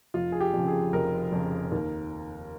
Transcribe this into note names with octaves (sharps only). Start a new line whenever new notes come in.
F1 F4
G#4
G4
F2 C#3
G#4
F1 A#4
F2 C#3
D#2